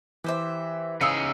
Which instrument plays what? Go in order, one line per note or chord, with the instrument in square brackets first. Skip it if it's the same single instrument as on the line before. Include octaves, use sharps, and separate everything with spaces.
[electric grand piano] E3 [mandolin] G4 C5 E5
[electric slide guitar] C#3 D#4 G#4 [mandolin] F5 [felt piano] D#6 E6 C#7